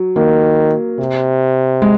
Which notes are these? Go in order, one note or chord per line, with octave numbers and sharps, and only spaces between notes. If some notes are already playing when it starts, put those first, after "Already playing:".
Already playing: F#3
D#3 A#3
C3
G#3